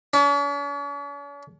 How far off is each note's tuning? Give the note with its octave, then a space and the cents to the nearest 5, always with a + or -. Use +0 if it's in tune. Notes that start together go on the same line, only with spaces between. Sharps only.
C#4 +45